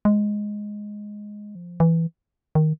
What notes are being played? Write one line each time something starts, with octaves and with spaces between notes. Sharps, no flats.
G#3
F3
E3
D#3